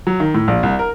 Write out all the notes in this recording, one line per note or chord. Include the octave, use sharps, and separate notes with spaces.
F#3
D#3
A2
A#1
C2
A#4